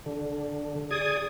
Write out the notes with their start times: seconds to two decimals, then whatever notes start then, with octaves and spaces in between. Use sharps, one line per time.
0.06 D3
0.91 G#4 D5 D#6 G#6